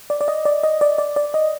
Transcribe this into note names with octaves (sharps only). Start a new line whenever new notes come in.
D5
D5
D#5
D5
D#5
D5
D5
D5
D#5